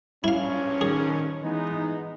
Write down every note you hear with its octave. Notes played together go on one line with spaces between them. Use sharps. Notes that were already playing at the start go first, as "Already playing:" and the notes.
A#1 G2 C#4 E4 F5
D#3 G#4
E3 G#3 B3 D#4